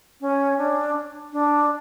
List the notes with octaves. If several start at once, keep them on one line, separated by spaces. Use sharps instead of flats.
C#4
D4
D4